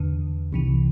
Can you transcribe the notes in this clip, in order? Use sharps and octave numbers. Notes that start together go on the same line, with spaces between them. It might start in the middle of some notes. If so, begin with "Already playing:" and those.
Already playing: E2 D3
C2 C3 E3